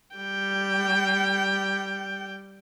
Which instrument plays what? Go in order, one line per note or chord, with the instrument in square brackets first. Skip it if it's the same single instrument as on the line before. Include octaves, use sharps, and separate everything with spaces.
[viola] G3 G5